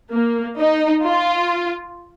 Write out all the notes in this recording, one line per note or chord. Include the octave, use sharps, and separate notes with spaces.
A#3
D#4
F4